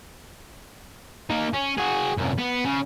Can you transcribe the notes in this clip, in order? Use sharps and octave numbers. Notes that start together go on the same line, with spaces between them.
A#3 D#4
C#4
F#4 G#4
C2 F#2
B3
C#3